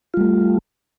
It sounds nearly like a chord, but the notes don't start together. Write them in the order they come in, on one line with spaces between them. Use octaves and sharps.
F4 G3 A3